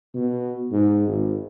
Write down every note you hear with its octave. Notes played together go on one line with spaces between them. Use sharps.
B2
G#2
G#1